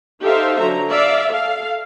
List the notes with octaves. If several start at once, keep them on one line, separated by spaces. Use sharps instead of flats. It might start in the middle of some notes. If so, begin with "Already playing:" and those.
D#4 G4 A4 C5 E5 F5
D3 F#3 A#5
D5 E5 F5
A4 F5